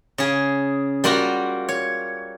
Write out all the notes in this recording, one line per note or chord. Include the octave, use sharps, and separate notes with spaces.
C#3 G#4
G3 A#3 F4 F#4
C#5